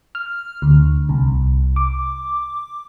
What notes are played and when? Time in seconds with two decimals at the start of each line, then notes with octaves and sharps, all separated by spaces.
0.15 F6
0.62 D2
1.09 C2
1.76 D6